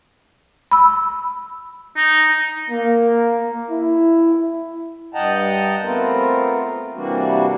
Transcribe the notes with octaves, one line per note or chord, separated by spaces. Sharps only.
B5 E6
D#4
A#3
E4
G2 D#5 F#5 G5 A5 A#5
A3 B3 C4 F4 A#4
C3 E3 G3 A#3 D4 F#4